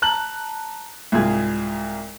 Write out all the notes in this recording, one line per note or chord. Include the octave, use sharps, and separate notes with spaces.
A5 A#5 F#6 F#7
C2 G#2 F4 G#4 G#6